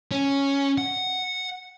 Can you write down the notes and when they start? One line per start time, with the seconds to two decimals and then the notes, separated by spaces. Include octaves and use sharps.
0.11 C#4
0.78 F#5